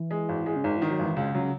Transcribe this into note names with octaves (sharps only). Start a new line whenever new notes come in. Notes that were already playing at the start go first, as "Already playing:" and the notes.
Already playing: E3
G#3
G#1
G#3
C#3
G#1 D#3
D#3 E3
F#3
G#1 E3
C#2 C#3
C#3 F#3